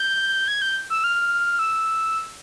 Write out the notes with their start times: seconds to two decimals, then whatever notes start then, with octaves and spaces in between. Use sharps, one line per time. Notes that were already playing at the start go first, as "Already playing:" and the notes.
Already playing: G6
0.48 G#6
0.62 G6
0.90 E6
1.04 F6
1.59 E6